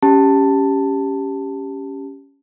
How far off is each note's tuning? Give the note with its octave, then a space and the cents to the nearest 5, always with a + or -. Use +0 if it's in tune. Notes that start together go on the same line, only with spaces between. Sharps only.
C#4 +5 G4 +0 A5 +10